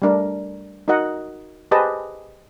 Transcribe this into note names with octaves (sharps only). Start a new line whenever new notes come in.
G3 A3 D4 A#4
D#4 F#4 A#4 D#5 F#5
G4 G#4 B4 C5 D#5 A5